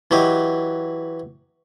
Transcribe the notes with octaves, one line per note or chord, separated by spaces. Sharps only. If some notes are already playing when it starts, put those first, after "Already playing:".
E3 F#3 G4 D#5